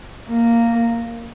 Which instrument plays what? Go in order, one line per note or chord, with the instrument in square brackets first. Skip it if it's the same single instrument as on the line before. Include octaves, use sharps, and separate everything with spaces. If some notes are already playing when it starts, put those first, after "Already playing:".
[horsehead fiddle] A#3